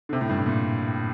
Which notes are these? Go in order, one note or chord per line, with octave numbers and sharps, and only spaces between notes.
D3
C3
A2
G2
A2
A#2